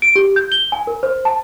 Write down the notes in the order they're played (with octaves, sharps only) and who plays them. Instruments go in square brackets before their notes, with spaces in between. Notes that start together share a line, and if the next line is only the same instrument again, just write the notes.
[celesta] D7
G4
G6
G7
G#5
A#4
C5
A5